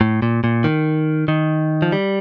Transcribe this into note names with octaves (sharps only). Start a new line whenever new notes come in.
A2
A#2
A#2
D#3
D#3
F3
G3